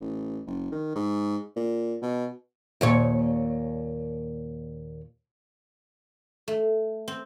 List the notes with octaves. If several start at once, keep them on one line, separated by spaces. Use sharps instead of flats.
A1
F#1
D#3
G#2
A#2
B2
D#2 A#2 C#5
A3
C4